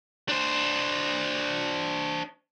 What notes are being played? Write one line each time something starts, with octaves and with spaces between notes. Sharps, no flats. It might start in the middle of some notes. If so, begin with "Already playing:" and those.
D4 C5